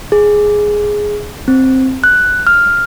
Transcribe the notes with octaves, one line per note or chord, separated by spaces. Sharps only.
G#4
C4
F#6
F6